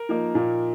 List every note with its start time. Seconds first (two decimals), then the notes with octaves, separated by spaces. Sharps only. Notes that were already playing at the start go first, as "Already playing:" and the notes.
Already playing: A#4
0.09 F3 A#3 D#4
0.35 A#2